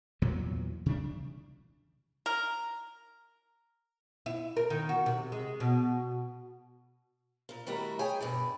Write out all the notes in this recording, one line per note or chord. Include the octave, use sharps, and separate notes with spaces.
E2 A#2 E3 F#3
C3 E3 G3 D4
A#4
E4
A#4
D#3
F#4
C3
G#3
B2
A#2 F4
D#3 G3 A3 E4 F#4 A#4
G#4 C#5 G5 G#5
G2 B2 D5